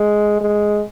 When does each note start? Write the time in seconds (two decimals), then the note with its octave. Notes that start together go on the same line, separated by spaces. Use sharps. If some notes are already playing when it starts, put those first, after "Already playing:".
Already playing: G#3
0.41 G#3